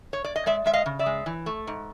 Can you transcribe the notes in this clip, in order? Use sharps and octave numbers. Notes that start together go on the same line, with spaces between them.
C#5
D5
D#5
G#3 D5 E5
G#3 E5
D#5 F5
C#3
D5 E5
G#3
E3
A3
G#2